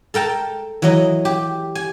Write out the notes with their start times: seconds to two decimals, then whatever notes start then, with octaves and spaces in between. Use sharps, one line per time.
0.14 A4 A#4 G5 A5
0.82 E3 F#3 D#5
1.25 G4
1.75 G#5